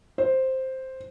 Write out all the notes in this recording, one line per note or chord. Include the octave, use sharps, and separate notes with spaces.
C5